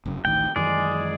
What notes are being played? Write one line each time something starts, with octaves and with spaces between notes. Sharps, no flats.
F1 F#2 C#3
A1 D2 D#3 G5
F#2 D#3 E3 G#3 G#4 D5